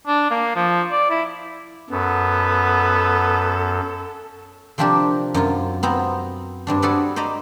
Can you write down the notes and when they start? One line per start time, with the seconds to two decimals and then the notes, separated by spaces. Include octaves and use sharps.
0.07 D4
0.31 A#3
0.56 F3
0.91 D5
1.10 E4
1.90 F#2 B3 A4
4.78 C3 F3 C4 D4 G4 A#4
5.34 F#2 C3 F4
5.83 B3 C4 A#5
6.67 G2 C4 D4
6.82 F#4 G#4 A4 B4 D5
7.16 C5 D5 D#5 A#5 B5